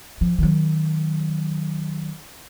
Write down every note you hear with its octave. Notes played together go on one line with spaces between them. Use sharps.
F3
D#3 F#3